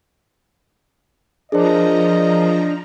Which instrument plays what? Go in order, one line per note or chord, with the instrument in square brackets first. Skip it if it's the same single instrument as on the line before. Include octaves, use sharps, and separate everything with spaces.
[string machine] F3 A#5 [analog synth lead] D4 [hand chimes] G#4 A#4 C5 [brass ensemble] D#5